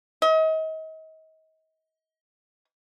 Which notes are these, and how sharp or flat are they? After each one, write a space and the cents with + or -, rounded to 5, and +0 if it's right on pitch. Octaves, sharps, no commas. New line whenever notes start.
D#5 +35